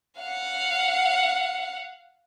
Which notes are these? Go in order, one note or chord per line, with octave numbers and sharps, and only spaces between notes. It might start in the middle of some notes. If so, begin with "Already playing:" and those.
F5 F#5